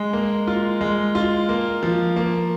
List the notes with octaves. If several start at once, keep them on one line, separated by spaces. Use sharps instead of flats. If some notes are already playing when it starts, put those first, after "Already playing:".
Already playing: G#3
A#3
F4
G#3
F4
A#3
F3
A#3